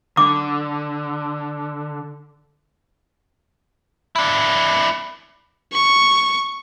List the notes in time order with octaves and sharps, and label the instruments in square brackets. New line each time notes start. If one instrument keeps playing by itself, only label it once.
[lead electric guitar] D3 [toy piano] D6
[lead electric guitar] D4 E4
[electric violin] C#6